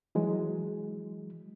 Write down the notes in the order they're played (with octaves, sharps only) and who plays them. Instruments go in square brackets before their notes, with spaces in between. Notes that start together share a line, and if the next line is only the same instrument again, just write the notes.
[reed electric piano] E3 F#3 G#3